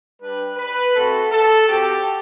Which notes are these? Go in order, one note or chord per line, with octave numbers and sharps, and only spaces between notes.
G3 D4 G4 B4
B4
A3 C4 F#4 A4
A4
C4 F#4 G4